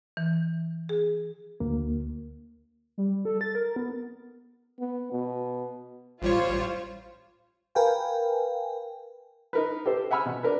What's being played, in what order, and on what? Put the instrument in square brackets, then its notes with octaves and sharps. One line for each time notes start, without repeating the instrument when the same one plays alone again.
[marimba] E3
G#4
[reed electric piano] D2 A#3
[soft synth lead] G3
A4
A6
A#4
B3
[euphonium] B3
B2
[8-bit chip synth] A1 G3 C#5 [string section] F4 C5
[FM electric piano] A#4 B4 F5 G5 G#5
[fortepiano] D#4 A#4 B4
G4 A4 C5
E5 F#5 G#5 B5 E6 F6
B2
D4 A#4 B4